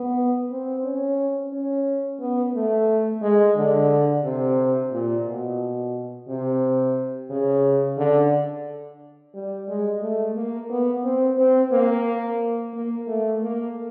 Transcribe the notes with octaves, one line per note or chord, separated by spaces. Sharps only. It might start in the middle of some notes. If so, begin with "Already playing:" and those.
Already playing: B3
C4
C#4
C#4
B3
A3
G#3
D3
C3
A#2
B2
C3
C#3
D3
G3
G#3
A3
A#3
B3
C4
C4
A#3
A#3
A3
A#3